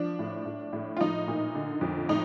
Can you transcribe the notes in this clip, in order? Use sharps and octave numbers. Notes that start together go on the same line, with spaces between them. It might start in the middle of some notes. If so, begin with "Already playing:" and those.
Already playing: F3 D4
A2
A2
A2
F4
F3 D#4
A#2
D3
F2
A2 D#4